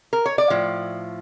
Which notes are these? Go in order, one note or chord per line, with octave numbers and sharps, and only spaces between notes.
A#4
C#5
D5
A2 F3